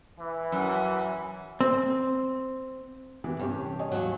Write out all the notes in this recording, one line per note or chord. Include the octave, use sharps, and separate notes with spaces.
E3
F#2
C4
E3 B3 G4
G2 C3 C#4 G4
C#5 D#5 G#5
D#2 F#3